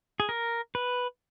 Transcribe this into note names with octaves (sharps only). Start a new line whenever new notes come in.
G#4
A#4
B4